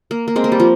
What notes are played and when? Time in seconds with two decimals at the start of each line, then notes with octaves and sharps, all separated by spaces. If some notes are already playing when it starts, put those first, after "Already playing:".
0.11 A#3
0.28 A#3
0.36 G#3 C4
0.44 A#3
0.52 G3
0.60 F3